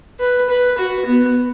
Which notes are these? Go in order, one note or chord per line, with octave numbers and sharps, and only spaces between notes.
B4
B4
F#4
B3